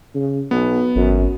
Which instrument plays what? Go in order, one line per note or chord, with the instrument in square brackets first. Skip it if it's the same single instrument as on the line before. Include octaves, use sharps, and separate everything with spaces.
[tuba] C#3
[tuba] B1 [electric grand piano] B3
[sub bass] G#1 [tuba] F#2